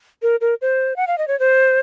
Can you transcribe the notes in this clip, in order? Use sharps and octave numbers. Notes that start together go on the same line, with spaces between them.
A#4
A#4
C5
F#5
F5
D#5
C#5
C5